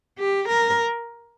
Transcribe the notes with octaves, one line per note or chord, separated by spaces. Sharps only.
G4
A#4